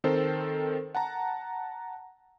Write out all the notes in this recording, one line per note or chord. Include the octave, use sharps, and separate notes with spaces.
D#3 C4 A4 A#4 C5
F#5 A5 A#5